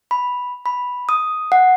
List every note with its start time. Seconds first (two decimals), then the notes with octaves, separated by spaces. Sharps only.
0.11 B5
0.66 B5
1.09 D#6
1.52 F#5